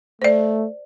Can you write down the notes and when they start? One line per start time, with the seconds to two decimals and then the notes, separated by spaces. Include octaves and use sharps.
0.22 A3 C5 D5